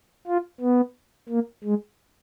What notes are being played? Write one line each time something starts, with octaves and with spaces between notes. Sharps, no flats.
F4
B3
A#3
G#3